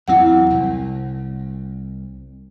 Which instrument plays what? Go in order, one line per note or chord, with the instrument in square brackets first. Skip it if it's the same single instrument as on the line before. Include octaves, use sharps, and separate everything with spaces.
[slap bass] E2 F#3 C4 [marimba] E4 F#5
[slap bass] C2